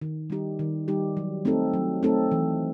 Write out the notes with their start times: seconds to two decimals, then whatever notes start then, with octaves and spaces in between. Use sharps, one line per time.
0.02 D#3
0.30 G3 D#4 G4
0.59 D#3
0.88 G3 D#4 G4
1.17 F#3
1.45 A3 C4 D#4 A4
1.73 F#3
2.03 A3 C4 D#4 A4
2.32 E3